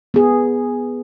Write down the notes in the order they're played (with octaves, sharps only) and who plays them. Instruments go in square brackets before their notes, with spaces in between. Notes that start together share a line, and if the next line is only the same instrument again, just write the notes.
[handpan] B3 G#4